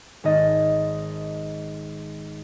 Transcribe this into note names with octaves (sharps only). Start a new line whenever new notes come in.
G#1 D#5 A6